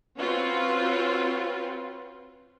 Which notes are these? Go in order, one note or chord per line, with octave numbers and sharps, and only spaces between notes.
C4 C#4 F4 F#4 B4